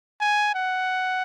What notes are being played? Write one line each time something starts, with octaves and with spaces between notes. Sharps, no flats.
G#5
F#5